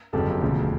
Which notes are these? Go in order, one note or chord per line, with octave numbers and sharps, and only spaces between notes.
G1 F2 C#3 F#3 G4 A4
E1 D2 C#3 F3